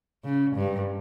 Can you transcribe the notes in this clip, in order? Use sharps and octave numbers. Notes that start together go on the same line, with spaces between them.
C#3
G2